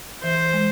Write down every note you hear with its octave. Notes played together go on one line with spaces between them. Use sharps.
E3 C5
G#3